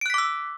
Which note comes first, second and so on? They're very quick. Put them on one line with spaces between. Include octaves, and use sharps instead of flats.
D7 F#6 B6 D6 E6